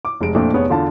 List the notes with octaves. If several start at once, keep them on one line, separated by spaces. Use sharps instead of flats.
D6
F1 G#3 D7
F2 A#2 A3 D4
F1 B3 G#4 C#5
E2 D3 F4 A5